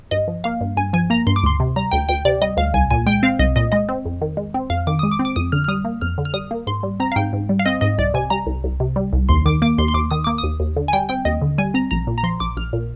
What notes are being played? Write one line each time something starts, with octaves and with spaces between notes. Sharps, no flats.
G2 D#5
F3
A#3 F5
G2
G2 G#5
F3 G#5
A#3 A#5
G2 C6
D6
D2 C6
C3
G3 A#5
D2 G5
D2 G5
C3 D5
G3 D#5
D2 F5
C2 G#5
A#2 G#5
G#3 G5
C4 F5
C2 D#5
A#2 D#5
G#3 D#5
C4
F2
D#3
G#3
C4
F2 F5
D#3 D6
G#3 D#6
D6
C4
D6
F2 D#6
D3 F6
F6
G3 D#6
A#3
F2 F6
D3
F6
G3 D#6
A#3
G#2 C6
G3
C4 A#5
F5
G#2 G5
G#2
G3
F5
C4 D#5
G#2 D#5
C2 D5
C3 G#5
G3 A#5
C2
C2
C3
G3
C2
D#2 C6
D#3 D6
A#3 D6
D#2 C6
C6
D#2 D6
D#3 D#6
A#3 D6
D#6
D#2
D#2
D3
G#5
G3 G5
C4 G5
D#2 D#5
D3
G3 G#5
C4 A#5
A#1 A#5
A#2
A#5
F3 C6
A#1 D6
A#1 F6
A#2